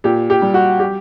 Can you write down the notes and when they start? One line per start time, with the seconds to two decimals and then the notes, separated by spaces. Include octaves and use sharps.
0.04 A#2 G4
0.30 G4
0.42 G3
0.54 F#4
0.80 G4